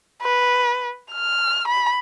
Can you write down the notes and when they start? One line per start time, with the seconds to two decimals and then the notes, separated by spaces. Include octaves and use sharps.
0.22 B4
1.13 F6
1.68 B5